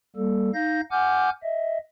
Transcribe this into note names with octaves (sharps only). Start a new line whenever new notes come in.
G3 A#3 A4
D#4 F5 G6 A#6
F#5 G#5 D6 F6 G6
D#5 E5